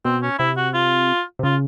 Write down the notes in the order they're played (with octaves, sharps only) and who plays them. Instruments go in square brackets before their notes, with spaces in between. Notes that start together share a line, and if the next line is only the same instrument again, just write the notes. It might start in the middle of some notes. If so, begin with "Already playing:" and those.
[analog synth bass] B2 [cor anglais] C4
[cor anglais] C#4
[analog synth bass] C3 [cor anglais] E4
[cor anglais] F#4
F4
[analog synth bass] C3
[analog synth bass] C#3 [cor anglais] F4